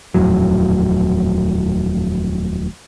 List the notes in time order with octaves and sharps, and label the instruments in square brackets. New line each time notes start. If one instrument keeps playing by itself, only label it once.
[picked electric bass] D#1 F2 A2 F#3